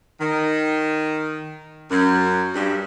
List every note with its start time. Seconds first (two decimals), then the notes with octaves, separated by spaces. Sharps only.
0.21 D#3
1.90 F#2
2.55 G2